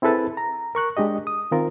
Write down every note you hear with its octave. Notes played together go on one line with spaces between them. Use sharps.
C4 E4 G#4 A4 B4 A5
A#5
A#4 C#6 F#6
G#3 D4 G4 D#5
D#6
D#3 C4 F4 A#4